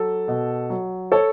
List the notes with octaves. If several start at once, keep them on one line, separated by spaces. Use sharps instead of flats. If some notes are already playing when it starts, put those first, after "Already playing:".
Already playing: F#3 A4
B2
F#3
A4 C#5